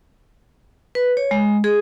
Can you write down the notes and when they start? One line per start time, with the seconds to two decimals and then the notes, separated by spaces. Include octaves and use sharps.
0.95 B4
1.17 C#5
1.31 G#3
1.64 G#4